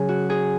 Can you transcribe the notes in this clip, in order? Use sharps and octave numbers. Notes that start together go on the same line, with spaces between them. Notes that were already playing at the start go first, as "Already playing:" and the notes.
Already playing: C#3 F#3 C#4 G#4
F#4
G#4